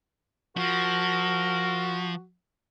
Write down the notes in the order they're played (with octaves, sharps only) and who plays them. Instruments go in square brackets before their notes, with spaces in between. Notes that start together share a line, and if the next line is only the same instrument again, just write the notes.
[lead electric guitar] F3 [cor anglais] F#4 [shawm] A#4